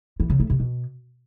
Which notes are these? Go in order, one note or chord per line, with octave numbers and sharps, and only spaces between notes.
E3
C#3
A3
C3
B2